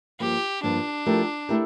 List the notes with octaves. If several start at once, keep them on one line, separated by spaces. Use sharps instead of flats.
G2 F3 A#3 G4
G2 F3 A#3 D4
F3 A3 E4 G4 A#4
A3 E4 G4 A#4